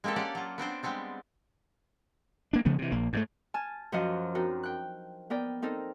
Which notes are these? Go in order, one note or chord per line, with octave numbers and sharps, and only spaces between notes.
G#3 A#3 C4 G4 A4
C#4 G4 D5 F#5
F#3 F4
B3 C4 D4 C5
G3 G#3 B3 C4 D4
A#3 D4
C#3 F3 A3 B3
C3 E3
A#1 A#3
G#2 D#3 A3
G#5 A5 F6
F#2 F3 F#4 D#5 F5 F#5
C4 D4 D#4 F#4 A#4
G5 F#6
B3 A#4 D5 G5
C4 D#4 A4 A#4